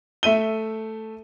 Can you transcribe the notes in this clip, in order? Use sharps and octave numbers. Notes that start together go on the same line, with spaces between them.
A3 E5 D#7 G7